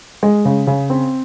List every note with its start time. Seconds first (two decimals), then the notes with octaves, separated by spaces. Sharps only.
0.23 G#3
0.45 C#3
0.67 C#3
0.90 C4